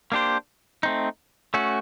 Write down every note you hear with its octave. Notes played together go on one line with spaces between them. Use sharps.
A#3 D4 G4 C5
A3 C4 D#4
A3 C#4 F#4